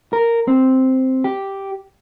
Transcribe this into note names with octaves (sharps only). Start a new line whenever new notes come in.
A#4
C4
G4